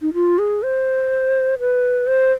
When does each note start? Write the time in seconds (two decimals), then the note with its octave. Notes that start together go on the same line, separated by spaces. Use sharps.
0.02 D#4
0.14 F4
0.38 G#4
0.63 C5
1.59 B4
2.07 C5